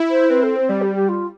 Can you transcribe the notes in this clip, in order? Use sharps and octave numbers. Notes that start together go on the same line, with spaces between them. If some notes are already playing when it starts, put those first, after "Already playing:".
Already playing: E4
C5
C4 B4
A4
C5
G3 D5
G4
G4
F4